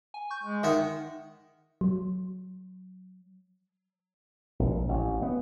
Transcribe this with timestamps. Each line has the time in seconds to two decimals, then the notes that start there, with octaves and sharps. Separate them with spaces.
0.14 G#5
0.30 C#6 G6
0.43 G#3
0.63 D#3 E5 F#5
1.81 F#3
4.59 A#1
4.89 A1
5.22 B3